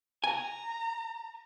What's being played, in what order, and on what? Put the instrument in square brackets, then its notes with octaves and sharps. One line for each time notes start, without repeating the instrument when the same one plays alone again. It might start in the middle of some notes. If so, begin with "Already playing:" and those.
[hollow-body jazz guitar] G#5 [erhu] A#5